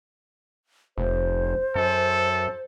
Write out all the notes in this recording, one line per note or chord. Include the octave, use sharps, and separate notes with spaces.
F1 C5
F#2 A4